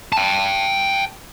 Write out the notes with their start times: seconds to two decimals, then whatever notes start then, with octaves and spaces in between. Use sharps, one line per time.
0.12 G5 A5